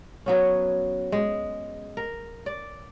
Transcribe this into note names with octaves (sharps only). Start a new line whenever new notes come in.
F#3 B3 C#4
G#3
A#4
D5